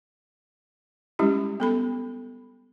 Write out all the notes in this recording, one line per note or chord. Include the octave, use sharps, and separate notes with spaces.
G3 G#3 C#4 E4 G4
B3 A4 B5